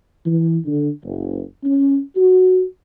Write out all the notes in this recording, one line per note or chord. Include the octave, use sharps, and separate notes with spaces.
E3
D3
F#1
C#4
F#4